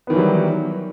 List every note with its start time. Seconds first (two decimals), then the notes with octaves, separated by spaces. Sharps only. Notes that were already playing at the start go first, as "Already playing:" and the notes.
0.07 B3
0.10 D#3
0.13 E3
0.16 F#3
0.18 G3